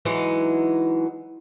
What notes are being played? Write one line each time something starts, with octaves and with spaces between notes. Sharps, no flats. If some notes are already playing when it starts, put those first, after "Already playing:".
E3 F#3 G#3 D#4